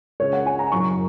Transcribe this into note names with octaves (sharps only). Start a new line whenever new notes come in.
C#2 C#3 G#3 C#5
F#5
G#5
A#5
F#1 F#2 F#3 C#6